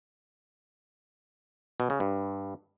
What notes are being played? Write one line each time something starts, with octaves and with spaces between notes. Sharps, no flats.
B2
C#3
G2